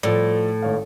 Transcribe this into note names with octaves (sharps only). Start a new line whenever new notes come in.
A2 F3 A4 D5
G#1 C#5 F5